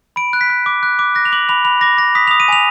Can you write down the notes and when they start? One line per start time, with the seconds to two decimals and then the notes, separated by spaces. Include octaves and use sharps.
0.16 B5 D7
0.33 F#6
0.41 B6
0.50 F#6
0.66 D6
0.83 F#6
0.99 D6
1.15 F#6 A#6
1.25 F7
1.32 D6 F#7
1.49 B5 F7
1.65 B5 F7
1.81 D6 A#6
1.98 D6 A#6
2.15 D#6 B6
2.27 D#6 F7
2.40 D#7
2.48 G#5 F7